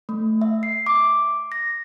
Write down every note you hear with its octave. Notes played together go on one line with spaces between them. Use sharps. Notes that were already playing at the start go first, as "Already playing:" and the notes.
A3
E5
C7
D6
A#6